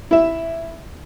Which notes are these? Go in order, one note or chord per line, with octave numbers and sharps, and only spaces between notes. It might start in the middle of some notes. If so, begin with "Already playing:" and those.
E4 E5